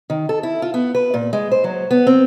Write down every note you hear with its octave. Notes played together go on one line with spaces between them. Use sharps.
D#3
A4
E4
F4
B3
B4
A#2
G#3
C5
F#3
B3
C4